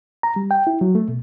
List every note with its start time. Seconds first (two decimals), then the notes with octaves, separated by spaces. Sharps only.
0.23 A#5
0.36 G3
0.51 G5
0.67 E4
0.81 F#3
0.95 A3
1.08 B2